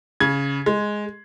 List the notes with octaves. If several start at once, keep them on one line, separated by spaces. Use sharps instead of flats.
C#3 G#6
G#3